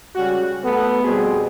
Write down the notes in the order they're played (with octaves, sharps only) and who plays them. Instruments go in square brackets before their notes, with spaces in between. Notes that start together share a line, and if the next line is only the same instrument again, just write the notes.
[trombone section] C#3 G3 G#3 C#4 F#4
A3 B3 A4
F2 B2 G3 C4 F#4 G#4